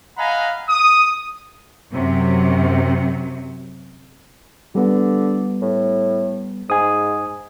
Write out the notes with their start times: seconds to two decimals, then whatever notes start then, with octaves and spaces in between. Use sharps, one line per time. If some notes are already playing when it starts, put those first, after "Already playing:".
0.17 D#5 F5 F#5 G#5 A#5 B5
0.69 D#6
1.93 F#2 C3 F#3
4.75 D3 G3 B3
5.62 A2
6.70 G#2 G#5 D#6